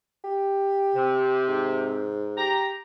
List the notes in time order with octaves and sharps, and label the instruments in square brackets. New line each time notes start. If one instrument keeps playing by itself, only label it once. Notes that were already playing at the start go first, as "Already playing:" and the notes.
[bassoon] G4
[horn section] C3
[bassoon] G#2
[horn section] G4 A#5